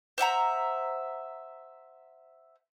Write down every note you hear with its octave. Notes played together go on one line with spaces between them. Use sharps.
C5 E5 F#5 A#5